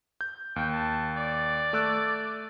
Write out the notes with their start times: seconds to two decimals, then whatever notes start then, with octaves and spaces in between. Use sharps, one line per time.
0.21 G6
0.56 D#2 G5
0.73 A5
1.17 D5
1.73 A3 E6 F#6